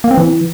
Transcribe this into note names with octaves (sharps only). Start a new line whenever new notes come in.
A#3
C4
E3